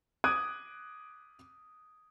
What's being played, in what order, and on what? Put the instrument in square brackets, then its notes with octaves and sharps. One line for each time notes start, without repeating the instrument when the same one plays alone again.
[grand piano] D6 D#6 F#6 G#6 D7 D#7